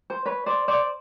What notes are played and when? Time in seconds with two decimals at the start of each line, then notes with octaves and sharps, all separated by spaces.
0.10 C5
0.26 B4 C#5
0.46 C5 D5
0.68 C5 D5